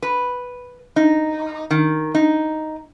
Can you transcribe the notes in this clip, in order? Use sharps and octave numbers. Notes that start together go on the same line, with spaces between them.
B4
D#4
D#3
D#4